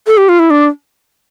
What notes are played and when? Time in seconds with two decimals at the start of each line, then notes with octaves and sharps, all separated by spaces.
0.07 A4
0.17 G4
0.29 F4
0.39 E4
0.50 D4